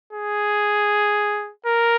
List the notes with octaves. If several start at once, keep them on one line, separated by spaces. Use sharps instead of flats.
G#4
A#4